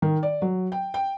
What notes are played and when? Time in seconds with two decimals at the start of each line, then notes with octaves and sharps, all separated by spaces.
0.02 D#3
0.23 D5
0.42 F#3
0.72 G5
0.94 G5